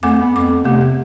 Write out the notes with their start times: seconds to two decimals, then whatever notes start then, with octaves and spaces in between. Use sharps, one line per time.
0.03 F2 A3 C4 D6
0.20 B3
0.36 F2 D6
0.64 C3 A3 B3
0.81 B3